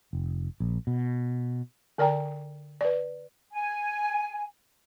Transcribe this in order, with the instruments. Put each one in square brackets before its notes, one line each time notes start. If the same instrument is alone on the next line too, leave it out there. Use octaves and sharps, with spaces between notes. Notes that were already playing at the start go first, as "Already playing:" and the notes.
[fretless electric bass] F1
A#1
B2
[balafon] D3 A#4 D5 G5 A#5
B4 D5
[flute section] G#5